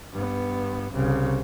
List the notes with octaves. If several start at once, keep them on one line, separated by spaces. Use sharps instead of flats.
G2 B3
C2 C#3